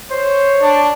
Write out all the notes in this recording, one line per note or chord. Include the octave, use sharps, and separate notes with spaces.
C5 C#5
D4